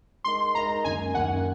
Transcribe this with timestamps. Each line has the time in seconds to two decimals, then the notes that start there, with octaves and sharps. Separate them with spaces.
0.24 G#3 D#4 A#4 D#5 C6
0.55 G#3 D#4 A#4 D#5 A#5
0.84 F#2 D#3 A#3 G#5
1.14 F#2 D#3 A#3 F#5